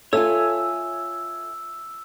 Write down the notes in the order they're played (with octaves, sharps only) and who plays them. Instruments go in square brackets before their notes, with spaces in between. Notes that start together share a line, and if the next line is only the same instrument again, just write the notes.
[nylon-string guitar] F4 A4 [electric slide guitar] C#5 E5 G#5 [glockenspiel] E6